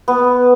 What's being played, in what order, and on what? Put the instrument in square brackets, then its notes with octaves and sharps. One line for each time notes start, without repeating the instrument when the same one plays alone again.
[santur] B3